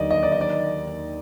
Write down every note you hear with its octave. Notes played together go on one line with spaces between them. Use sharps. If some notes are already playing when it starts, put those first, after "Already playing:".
Already playing: D#2 D3 F#3 D5 D#5
D#5
D5
D#5
D5